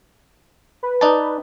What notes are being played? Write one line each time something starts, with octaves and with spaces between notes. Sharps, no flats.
B4
D#4 D5 A5